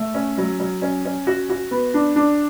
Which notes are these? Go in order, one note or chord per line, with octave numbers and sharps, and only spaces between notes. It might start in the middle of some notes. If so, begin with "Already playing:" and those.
Already playing: A3
C#4
F#3
F#3
C#4
C#4
F#4
F#4
B3
D4
D4